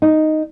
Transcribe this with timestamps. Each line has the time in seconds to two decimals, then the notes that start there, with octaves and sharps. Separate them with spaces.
0.02 D#4